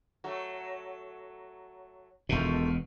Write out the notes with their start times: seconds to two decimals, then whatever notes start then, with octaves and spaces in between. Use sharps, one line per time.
0.24 F#3 A3
2.29 E1 B2 D#3 A3 F4